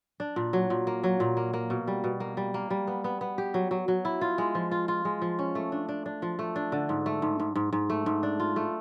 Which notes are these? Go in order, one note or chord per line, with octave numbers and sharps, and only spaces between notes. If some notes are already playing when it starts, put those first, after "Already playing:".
D4
A#2
F#3
A#2
A#3
F#3
A#2
A#3
A#3
B2
G3
B2
A#3
G3
A#3
G3
B3
B3
B3
G4
F#3
F#3
F#3
E4
F4
G#3
F3
F4
F4
G#3
F3
C#4
A3
D4
D4
D4
F3
A3
D4
D3
G#2
A3
G#2
G#2
G#2
G#2
A3
G#2
D4
F4
A3